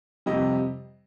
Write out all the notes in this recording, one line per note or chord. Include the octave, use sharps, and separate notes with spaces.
F2 C3 G3 D#5